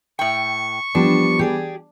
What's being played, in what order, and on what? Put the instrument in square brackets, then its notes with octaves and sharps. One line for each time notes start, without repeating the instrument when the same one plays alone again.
[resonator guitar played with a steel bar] A2 G5 [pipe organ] C#6
[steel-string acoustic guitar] F3 [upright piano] G3 B3 [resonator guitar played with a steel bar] D4
[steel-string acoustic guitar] G4 G#4 D5